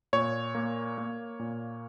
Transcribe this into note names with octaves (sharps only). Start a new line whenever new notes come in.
A#2 C#5
A#3
A#3
A#2